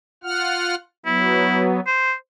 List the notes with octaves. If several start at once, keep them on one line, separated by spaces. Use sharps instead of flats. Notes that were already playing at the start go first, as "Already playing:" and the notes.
F4 F#5 F6
F#3 B3 E4
C5